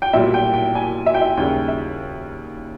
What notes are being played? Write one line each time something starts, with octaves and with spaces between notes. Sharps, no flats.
G5
B1 A#2 G3 E5
G5
G5
G#5
E5
G5
E5
D#2 C#3 G3 G5
E5